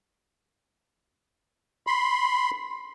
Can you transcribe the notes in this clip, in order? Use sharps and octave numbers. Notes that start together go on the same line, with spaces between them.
B5 C6